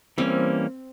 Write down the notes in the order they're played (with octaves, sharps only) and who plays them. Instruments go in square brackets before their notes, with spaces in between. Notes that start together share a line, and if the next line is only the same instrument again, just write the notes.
[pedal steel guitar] E3 G3 A#3 C#4 [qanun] C4